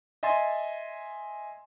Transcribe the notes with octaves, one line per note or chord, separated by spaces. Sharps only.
D#5 E5 G#5 C6 A6